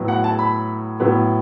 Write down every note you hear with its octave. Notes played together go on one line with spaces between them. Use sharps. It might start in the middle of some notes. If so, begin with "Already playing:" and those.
Already playing: A2 F#3 B3
F#5
A5
B5
A2 F#3 B3